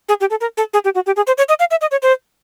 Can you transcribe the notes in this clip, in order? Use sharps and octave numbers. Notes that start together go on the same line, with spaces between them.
G#4
G4
A4
A#4
A4
G#4
G4
F#4
G4
G#4
C5
C#5
D#5
F5
E5
D#5
C#5
C5